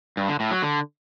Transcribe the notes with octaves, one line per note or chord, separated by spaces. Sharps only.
G2
D3
A2
F#3
D3